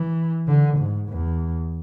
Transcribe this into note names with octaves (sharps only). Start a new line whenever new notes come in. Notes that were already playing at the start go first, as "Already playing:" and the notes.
Already playing: E3
D3
G#2
E2